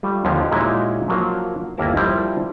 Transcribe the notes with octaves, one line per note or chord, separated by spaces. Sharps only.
G3 A3 F4
D#2 D3 F3 C#4
A#2 G#3 C#4 D#4 E4 F#4
F3 F#3 A#3 A#4 F5
G1 D#2 A#3 E4 A#4 A5
F3 G3 E4 A#4 C5 D5